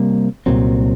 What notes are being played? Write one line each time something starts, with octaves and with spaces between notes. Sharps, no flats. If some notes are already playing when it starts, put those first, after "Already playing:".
Already playing: C3 G3 A#3
C2 A#2 F#3 C4